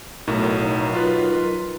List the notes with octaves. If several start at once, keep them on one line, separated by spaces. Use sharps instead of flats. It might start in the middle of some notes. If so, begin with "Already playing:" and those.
B1 A2 F#3 D#4 A#4
F4 B4